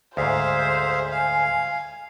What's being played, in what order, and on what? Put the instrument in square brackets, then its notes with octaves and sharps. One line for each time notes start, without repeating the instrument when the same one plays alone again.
[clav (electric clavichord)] D2 G#2 [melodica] G#4 E5 F5 [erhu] C5
[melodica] F5 [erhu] G#5